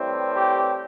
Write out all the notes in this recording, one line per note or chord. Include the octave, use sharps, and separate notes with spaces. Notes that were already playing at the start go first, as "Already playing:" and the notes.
Already playing: A2 E3 G3 C4
G4